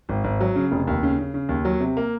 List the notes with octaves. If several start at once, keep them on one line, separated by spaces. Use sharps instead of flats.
G#1
G#1
F#3
C#3
F1
D#2
C#3
C#3
C#3
D#2
F#3
C3
A#3